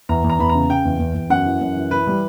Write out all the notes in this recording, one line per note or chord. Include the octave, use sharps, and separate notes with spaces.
E2 A#5
E2
A#5
E2 B5
A#5
C#3
C#3 G5
E2
E2
E2
F#2 F#5
E3
F#2
E3
E3 B4
G3